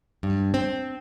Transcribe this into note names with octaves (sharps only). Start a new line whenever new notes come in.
G2
C4